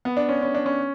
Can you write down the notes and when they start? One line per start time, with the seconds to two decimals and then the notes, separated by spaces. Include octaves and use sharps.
0.05 B3
0.17 D4
0.29 C#4
0.42 C#4
0.55 D4
0.66 C#4